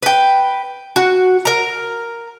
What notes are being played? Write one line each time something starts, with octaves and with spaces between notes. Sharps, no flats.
B4 G5
F#4
A#4 A#5